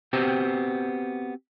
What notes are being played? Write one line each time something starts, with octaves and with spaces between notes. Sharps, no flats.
B3 C4 F#4 G4 C5